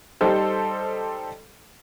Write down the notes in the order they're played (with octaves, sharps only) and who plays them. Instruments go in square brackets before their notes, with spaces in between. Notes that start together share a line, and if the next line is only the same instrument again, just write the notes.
[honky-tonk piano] G3 D#4 A4 C5